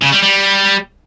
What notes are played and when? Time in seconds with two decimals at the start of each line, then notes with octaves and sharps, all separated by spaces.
0.03 C#3
0.13 G3
0.23 G3